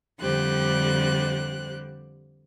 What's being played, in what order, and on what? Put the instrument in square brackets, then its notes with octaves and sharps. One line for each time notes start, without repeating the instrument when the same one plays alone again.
[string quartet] F2 D3 G3 G4 C5 F#6